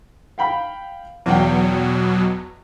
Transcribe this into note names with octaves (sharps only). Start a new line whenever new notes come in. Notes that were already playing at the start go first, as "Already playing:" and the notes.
F5 G5 B5
E2 B2 F#3 G5